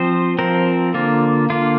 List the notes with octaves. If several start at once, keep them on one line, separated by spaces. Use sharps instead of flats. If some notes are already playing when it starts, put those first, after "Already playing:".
Already playing: F3 C4 C5
F3 C4 A#4
D3 A#3 F4
D3 A#3 F4